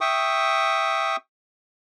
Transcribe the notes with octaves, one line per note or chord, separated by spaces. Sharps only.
E5 G5 C#6 D#6